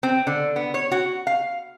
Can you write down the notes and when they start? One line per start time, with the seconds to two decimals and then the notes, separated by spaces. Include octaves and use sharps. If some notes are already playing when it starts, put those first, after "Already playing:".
0.03 C4
0.27 D3
0.56 B3
0.74 C#5
0.91 F#4
1.27 F5